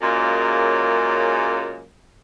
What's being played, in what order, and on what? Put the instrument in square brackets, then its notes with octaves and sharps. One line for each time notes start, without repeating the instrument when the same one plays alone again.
[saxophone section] F#2 A#2 C#3 G#3 A#3